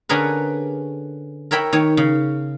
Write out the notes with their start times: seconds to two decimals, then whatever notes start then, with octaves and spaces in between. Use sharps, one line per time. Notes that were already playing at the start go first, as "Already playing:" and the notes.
0.09 D3 C#4 D4 G#4 A#4 B4
1.51 A#4 C#5 E5 G5 B5
1.73 D#3 C#5
1.97 C#3